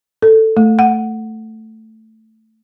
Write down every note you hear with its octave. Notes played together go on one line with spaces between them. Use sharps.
A4
A3
F#5